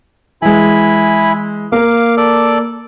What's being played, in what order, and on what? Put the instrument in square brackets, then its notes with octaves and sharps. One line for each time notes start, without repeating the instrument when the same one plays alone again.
[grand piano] E3 G#3 [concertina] E4 G#5 B5
[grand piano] A#3 A#4 [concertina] F5 D6
[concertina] A4 D5 D6